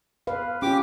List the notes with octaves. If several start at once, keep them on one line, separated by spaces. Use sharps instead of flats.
B4 F5
C#4 F4 G4 D6